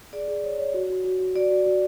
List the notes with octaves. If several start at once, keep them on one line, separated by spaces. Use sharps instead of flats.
G#4 D5
G#4
C#5
C#5
F#4
F#4
F#4
F#4
F#4 D5
F#4
F#4